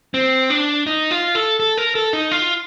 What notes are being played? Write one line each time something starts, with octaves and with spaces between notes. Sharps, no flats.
C4
D4
D#4
F4
A4
A4
A#4
A4
D#4
F4